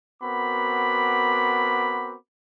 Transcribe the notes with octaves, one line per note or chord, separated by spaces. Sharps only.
B3 C4 F#4 A#4 B5 D6